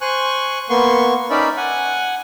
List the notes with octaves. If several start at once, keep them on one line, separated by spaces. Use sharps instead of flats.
C5 G#5 C#6 F#6
A#3 B3 C6 C#6
C#4 D#4 A#4 D5 E5 B5
F#5 G#5